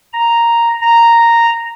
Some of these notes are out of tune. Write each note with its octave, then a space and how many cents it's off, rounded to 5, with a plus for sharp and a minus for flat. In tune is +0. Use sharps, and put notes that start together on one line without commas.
A#5 +0
A#5 -5